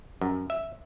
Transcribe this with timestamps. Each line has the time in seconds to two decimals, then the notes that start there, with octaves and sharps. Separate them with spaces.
0.21 F#2
0.50 E5